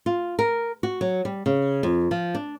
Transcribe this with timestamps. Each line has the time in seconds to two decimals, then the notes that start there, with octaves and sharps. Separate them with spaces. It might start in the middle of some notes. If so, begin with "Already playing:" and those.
0.06 F4
0.39 A#4
0.83 F#4
1.01 F#3
1.25 G3
1.46 C#3
1.83 F2
2.11 F3
2.35 D4